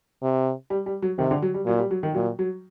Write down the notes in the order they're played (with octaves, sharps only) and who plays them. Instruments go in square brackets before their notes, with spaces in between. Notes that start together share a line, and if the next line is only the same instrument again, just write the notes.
[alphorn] C3
[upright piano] G3
G3
F#3
[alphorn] C3 [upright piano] D#3
[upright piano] D3
F#3
G3
[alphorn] A#2 [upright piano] F#3
[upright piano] G3
F#3
D#3
[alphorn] A#2 [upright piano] F#3
[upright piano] F#3